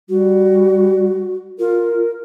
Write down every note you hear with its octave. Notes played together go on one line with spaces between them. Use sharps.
G3 F#4
F4 A#4